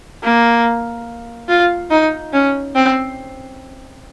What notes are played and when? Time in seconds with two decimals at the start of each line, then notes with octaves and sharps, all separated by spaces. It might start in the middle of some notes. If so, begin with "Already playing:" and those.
0.23 A#3
1.49 F4
1.90 D#4
2.33 C#4
2.75 C4